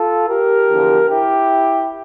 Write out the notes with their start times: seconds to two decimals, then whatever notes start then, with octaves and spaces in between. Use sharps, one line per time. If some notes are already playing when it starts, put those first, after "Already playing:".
Already playing: F4 A4
0.28 G4 A#4
0.69 E2 D3 F3
1.09 E4 G4